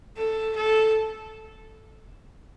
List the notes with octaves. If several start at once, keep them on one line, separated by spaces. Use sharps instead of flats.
A4
A4